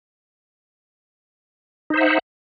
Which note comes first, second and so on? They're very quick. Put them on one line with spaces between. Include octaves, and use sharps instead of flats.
D#4 C5 E5 F#5